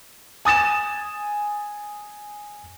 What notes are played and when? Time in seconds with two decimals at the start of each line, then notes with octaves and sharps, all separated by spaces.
0.45 G#5 D#6 A6 E7